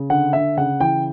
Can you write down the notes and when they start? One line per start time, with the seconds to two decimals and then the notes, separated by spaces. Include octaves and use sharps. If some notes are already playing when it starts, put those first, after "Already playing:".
Already playing: C#3
0.10 D3 F#5
0.33 D3 E5
0.57 C#3 F#5
0.80 E3 G5